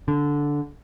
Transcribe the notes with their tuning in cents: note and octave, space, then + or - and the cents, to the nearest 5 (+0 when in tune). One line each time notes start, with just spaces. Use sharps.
D3 -10